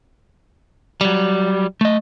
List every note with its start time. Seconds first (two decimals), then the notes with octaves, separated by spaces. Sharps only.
1.01 F#3 G3
1.81 A3 D#5